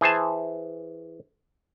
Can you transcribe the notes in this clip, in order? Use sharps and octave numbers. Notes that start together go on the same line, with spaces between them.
E3 G#4 C5 G#5 A5